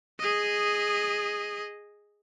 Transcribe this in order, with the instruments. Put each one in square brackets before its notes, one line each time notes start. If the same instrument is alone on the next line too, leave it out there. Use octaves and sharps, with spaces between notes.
[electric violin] G#4 D#5